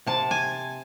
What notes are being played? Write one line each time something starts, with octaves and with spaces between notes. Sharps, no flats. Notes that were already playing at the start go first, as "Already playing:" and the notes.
C3 A5
G#5